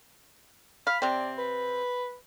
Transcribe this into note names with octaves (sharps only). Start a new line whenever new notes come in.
F5 B5
C3 C4 D5
B4